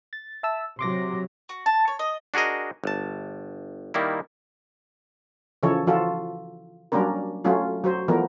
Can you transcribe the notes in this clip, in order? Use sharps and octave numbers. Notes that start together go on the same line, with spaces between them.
A6
E5 A5 E6
C3 F#3 C6 D6 A#6
F#4
A5
C#5
D#5
D4 F#4 G#4 A#4 D#5
G1 A5
D#3 G3 A#3 E4
C#3 E3 F3 A4 C#5
E3 F3 F4 F#4 A4
F#3 G3 A#3 C#4 D4 A#4
F#3 A3 C#4 F4
F#3 F#4 C5
E3 F3 A3 B3 A#4